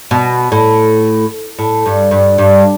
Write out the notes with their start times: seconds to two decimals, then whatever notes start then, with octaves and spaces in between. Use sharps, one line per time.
0.11 B2
0.52 A2
1.59 A2
1.86 G2
2.11 G2
2.38 G2